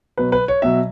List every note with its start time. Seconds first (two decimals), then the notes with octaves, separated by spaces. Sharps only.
0.17 B2 F#3 B4
0.32 B4
0.48 C#5
0.62 B2 F#3 E5